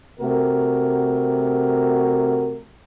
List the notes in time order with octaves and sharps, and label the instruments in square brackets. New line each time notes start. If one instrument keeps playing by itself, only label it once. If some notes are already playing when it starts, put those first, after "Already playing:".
[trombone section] C3 A3 F#4 A#4